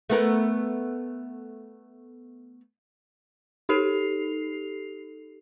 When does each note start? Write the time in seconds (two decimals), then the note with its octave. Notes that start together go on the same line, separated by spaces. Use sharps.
0.10 A3 B3 A#4
3.69 D#4 G4 A4 C7 F7